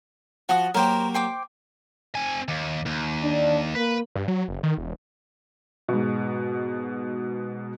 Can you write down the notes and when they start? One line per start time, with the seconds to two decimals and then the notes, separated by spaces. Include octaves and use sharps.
0.49 F3 F#4 F#5 D#6
0.74 F#3 A#3 G4 A#4 C5
1.14 C5 G5 D6
2.15 C4 G#5
2.48 D#2
2.86 D#2
3.23 D4
3.75 A#3 B4
4.16 G2
4.28 F#3
4.48 F#1
4.63 D#3
4.78 E1
5.88 G#2 B2